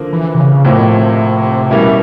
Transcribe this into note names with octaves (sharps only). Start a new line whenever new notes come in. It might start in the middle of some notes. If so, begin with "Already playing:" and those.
Already playing: D3 F3 A#3
E3
C3
C#3
A2 C3 F3 A#3
B2
C3
B2 E3 G3 A#3 C#4 E4